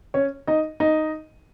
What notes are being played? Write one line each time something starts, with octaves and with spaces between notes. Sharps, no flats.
C#4 C#5
D#4 D#5
D#4 D#5